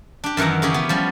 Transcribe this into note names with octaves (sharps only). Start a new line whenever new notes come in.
D4 G4
F#2 D#3 E3 F#5 A#5
C#3 C#4 G4 G#4
B3
F3 G3 C#4